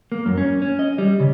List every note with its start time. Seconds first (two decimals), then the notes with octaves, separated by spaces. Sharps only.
0.12 A#3
0.26 F#2
0.38 C#4
0.62 C#4
0.79 D#5
0.98 G3
1.20 C#3